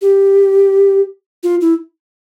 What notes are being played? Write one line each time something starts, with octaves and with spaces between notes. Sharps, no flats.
G4
F4
E4